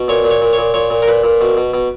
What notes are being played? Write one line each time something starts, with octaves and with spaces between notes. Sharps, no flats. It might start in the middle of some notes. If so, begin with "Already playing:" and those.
Already playing: B2
A#2 C#5
A#2
C#5
A#2
A#2 C#5
A#2 C#5
A#2
A#4
A#2 B4
A#2
B2
B2
B2